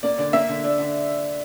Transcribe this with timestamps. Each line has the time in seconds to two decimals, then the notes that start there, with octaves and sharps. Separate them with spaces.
0.03 A#3 D5
0.18 D3 D5
0.33 A#3 E5
0.49 D3
0.64 D4
0.79 D3